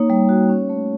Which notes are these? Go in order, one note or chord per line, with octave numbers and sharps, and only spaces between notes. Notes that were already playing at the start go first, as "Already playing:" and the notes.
Already playing: A#3 D#4 C#5
G3
F#4
C#4
A3